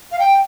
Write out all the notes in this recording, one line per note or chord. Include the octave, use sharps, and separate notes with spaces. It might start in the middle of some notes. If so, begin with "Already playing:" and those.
F5
G5